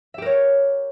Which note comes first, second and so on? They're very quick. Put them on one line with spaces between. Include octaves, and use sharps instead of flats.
E5 G4 A#4 C#5